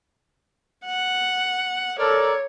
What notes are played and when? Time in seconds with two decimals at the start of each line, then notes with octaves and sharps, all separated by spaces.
0.85 F#5
1.99 A4 A#4 C#5 D5